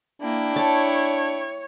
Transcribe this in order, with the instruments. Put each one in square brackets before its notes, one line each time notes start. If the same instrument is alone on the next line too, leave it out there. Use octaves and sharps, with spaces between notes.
[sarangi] A#3 [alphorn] D4 [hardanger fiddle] E4 G5
[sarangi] C#5 [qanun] A5